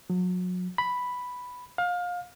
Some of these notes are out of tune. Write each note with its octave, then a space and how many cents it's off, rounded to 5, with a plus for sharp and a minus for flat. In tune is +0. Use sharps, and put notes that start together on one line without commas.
F#3 -30
B5 +0
F5 +25